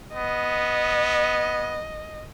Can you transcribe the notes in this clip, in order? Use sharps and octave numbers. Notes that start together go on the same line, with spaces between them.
B3 D#5